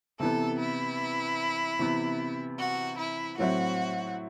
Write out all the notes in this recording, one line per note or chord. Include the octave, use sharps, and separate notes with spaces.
C3 E3 B3 A4
E4
C3 E3 B3
F#4
E4
A2 F#3 C4 E4 F#4